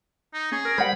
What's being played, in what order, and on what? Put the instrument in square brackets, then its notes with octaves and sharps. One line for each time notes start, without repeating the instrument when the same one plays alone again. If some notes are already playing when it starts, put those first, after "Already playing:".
[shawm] D#4
[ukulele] C#4 [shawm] G#4
[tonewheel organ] A#4
[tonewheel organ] G3 B5 [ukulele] C5 F#5